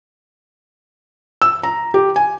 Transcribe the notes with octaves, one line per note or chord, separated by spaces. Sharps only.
E6
A#5
G4
G#5